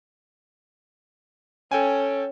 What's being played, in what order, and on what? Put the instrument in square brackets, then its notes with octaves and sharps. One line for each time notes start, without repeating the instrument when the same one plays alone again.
[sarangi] C#4 [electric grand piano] A4 G5 G#5